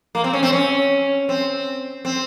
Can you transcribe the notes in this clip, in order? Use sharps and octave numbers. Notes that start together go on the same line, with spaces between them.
A#3
C4
C#4
C4
C#4
C4
C4